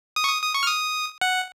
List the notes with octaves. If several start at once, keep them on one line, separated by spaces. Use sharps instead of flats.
D#6
C#6
D#6
D#6
C#6
F6
D#6
F#5